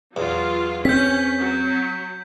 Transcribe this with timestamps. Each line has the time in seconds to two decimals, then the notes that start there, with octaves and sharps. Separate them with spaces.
0.16 E2 F#3 F4
0.85 C4 C#4 G6 B6
1.40 F#3